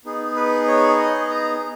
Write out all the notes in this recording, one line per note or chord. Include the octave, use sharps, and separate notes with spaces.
B3 D#4 G#4
B4
C#5
D#5
A#5